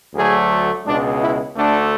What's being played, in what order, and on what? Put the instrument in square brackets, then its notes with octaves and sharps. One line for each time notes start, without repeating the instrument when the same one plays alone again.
[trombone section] D2 D3 F#3 A3 G#4
C#2 B2 G#3 D4
E4
D2 D3 A3 D4